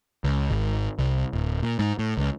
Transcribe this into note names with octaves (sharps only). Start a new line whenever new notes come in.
C#2
G#1
C2
D1
A#2
G#2
A2
C#2